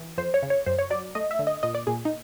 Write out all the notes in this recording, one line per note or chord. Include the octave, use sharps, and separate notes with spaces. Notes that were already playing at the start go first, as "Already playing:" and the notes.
Already playing: E3
F2 C5
C#5
C#3
C#5
F#2 C5
C#5
F#3 D5
A3 D#5
E5
D3
D#5
A#2 D#5
D5
A#2 G#4
D#4